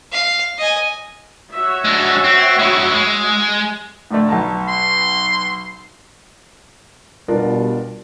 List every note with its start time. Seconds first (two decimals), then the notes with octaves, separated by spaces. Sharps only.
0.13 F5
0.59 D#5 G#5
1.54 F#4 C#5 E5
1.85 G#3 D4
2.24 C4
2.59 G#3 E4
2.93 G#3
4.11 A2 D3 A3
4.29 B1 A5 A#5
4.68 C6
7.28 B2 G3 D4 F4 A#4